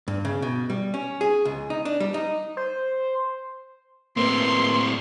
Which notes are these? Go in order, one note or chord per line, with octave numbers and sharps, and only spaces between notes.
G2
C#3
B2
G3
C#4
G#4
C#2
D#4
D4
G3
D#4
C5
A2 A#3 C4 B4 C6